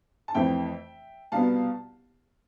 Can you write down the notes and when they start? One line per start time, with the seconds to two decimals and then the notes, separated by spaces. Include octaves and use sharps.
0.28 A5
0.34 F2 E3 A3 C4 E5 G5
1.32 C2 B2 B3 F5 A5